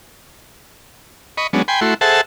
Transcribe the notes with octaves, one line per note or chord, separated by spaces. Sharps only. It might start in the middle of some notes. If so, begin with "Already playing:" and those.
D#5 B5 C#6
F#3 G#3 B3 C#4 D4
G5 G#5 B5 C6
A3 E4 F#4 C6
G#4 A4 C5 E5 F#5 A5